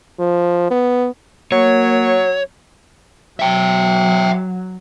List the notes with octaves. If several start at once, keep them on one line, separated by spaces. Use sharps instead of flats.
F3
B3
F#3 A#3 C#5
F#3 E5 G5